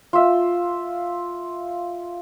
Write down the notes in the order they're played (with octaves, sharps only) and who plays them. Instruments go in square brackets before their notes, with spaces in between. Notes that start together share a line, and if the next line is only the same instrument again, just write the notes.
[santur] F4 E5